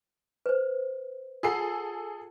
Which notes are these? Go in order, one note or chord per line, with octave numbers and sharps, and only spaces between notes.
B4 C5
F4 G#4 A4 F#5 E6 C7